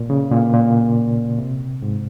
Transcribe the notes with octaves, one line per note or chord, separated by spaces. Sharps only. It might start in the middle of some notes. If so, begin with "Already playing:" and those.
Already playing: A#2
C#3
A#2
A#2
C3
G#2